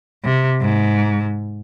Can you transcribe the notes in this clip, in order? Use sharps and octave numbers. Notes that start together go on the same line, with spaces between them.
C3
G#2